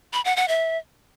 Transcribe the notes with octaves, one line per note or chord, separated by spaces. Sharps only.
B5
F#5
F#5
E5